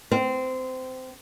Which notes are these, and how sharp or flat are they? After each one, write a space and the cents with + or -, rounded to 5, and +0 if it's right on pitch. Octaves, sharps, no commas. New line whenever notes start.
C4 -20